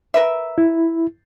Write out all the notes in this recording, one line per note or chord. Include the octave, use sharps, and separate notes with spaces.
A#4 B4 E5
E4